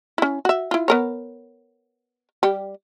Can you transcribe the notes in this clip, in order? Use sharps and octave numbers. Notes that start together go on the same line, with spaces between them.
C#4 E4
F#4 E5
E4 F4
B3 A#4 C#5
G3 G4